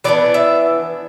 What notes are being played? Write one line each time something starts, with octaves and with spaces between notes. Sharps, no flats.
E3 B3 D4 D5
E5